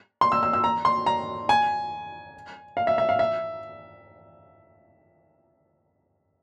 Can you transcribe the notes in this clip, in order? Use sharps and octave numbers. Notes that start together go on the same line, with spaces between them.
C6
E6
E6
E6
A#5
C6
A#5
G#5
F5
E5
E5
F5
E5